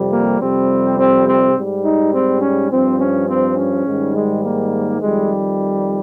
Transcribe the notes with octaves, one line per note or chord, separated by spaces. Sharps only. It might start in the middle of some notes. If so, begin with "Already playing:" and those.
Already playing: F2 C3 G3
A#3
F2 C3 G3 C4
C4
C4
G#2 G3
D#4
C4
C#4
G2 F3 C4
C#4
C4
C#4
G#2 D#3 G3
G#3
A#3
F2 D#3 G3 G#3